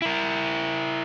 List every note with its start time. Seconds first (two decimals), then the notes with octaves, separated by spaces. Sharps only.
0.02 E4 A#4